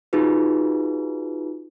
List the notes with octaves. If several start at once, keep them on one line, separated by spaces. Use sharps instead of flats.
D#4 F4 F#4 G#4 B4